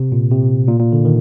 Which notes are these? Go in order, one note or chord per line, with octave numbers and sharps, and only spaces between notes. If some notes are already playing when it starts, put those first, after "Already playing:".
Already playing: C3
A#2
C3
A#2
A#2
D3
D#3